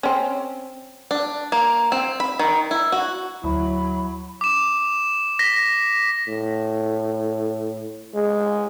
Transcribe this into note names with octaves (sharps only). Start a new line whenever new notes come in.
C4 C#4
D4
A#3
C4
B5
D#3
E4
F#4
D2 F#3 E4 B5
D6 E7
A#6 B6
A2
G#3